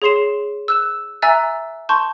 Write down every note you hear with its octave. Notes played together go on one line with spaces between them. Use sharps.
G#4 C#5 C6 C7 E7
E6 F#6 E7
E5 G#5 A#5 E6 F#6 A6
A5 C6 C#6 G6